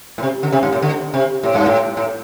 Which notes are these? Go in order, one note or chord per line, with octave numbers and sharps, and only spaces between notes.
A2
C3
D3
C3
G2
A2
D3
C3
A2
G2
A2
A2